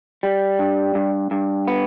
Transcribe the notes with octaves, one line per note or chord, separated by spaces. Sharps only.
G3
G2
G2
G2
B3